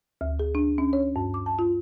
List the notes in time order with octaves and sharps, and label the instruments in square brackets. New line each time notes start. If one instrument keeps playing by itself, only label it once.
[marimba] D2
G#4
D4
C#4
C#5
G2
D6
A5
F4